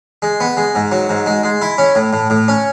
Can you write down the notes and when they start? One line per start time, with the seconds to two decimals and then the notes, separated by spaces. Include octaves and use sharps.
0.22 G#3
0.40 B3
0.57 G#3
0.75 G#2
0.91 F#3
1.09 G#2
1.26 G#3
1.43 G#3
1.61 E4
1.78 C#4
1.95 A2
2.13 A2
2.30 A2
2.48 C#4